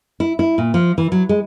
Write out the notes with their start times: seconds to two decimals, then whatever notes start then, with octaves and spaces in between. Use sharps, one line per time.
0.20 E4
0.39 E4
0.58 A#2
0.74 F3
0.98 E3
1.12 F#3
1.29 G#3